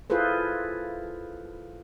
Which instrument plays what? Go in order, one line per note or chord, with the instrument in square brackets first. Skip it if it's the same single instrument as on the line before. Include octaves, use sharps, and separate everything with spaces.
[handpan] E4 F4 G#4 A4 B4 C5